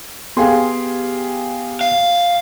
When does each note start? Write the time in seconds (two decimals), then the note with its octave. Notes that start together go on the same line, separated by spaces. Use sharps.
0.37 B3 G4 G#4 F5 C6
1.81 F5